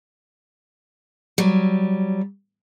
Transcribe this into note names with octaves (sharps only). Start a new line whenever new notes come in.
F#3 G3